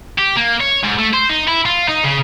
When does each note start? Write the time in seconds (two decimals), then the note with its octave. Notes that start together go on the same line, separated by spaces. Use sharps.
0.18 G4
0.37 A#3
0.61 C#5
0.84 G#2
0.99 A3
1.14 C5
1.29 D#4
1.48 E4
1.66 F4
1.88 D#4
2.04 C#3